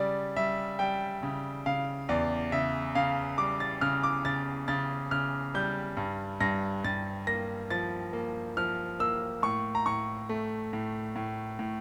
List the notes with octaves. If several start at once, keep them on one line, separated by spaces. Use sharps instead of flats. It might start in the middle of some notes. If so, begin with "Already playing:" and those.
Already playing: C#3 G3 D5
G3 E5
G3 G5
C#3
C#3 F5
E2 D5
C#3 E5
C#3 F5
G3 D6
A6
C#3 F6
D6
C#3 A6
C#3 A6
C#3 F6
G3 G6
G2
G2 A#6
G2 A6
A#3 A#6
F3 A6
A#3
F3 F6
A#3 E6
A2 C#6
A#5
A2 C#6
A3
A2
A2
A2